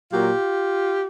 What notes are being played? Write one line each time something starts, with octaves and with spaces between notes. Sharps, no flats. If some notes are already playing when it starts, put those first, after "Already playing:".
A#2 F#3 A#3 F4 G4